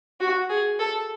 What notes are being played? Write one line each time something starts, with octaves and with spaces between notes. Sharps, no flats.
F#4
G#4
A4